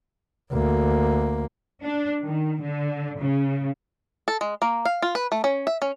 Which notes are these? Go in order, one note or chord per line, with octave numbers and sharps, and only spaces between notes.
D2 A#3
D4
D#3
D3
C#3
A4
G#3
A#3
F5
F4
B4
A3
C#4
E5
C#4